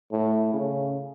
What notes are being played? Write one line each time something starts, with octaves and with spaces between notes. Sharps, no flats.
A2
C#3